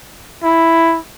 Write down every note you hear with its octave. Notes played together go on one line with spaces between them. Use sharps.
E4